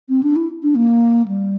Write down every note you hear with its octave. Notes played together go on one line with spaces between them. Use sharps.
C4
D4
E4
D4
A#3
G3